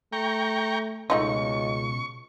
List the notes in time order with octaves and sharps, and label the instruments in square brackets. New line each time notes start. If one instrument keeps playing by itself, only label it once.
[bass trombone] A3 [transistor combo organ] G5 A#5 C#6
[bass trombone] C#2 [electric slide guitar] B2 D#5 [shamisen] A3 D#4 F4 [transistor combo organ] C#6